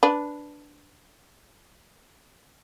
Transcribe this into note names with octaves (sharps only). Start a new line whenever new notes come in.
D4 B4